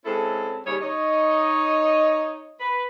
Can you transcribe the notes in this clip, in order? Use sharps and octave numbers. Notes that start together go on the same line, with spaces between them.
G#3 C4 C#4 E4 A4
D#2 C#3 G3 G4 G#4 C#5
D#4 C#5 D#5
B4